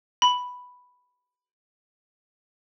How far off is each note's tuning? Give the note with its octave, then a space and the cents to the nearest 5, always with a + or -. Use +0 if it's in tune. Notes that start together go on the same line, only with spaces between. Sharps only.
B5 +0